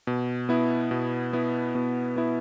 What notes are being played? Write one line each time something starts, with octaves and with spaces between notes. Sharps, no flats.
B2
B3 E4
B2
B3 E4
B2
B3 E4